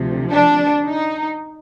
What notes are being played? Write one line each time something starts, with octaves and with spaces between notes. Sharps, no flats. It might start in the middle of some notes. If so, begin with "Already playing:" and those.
Already playing: D2 C3 F3
D4
D#4